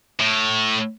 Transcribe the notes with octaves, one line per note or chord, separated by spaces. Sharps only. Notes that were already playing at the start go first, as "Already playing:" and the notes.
A2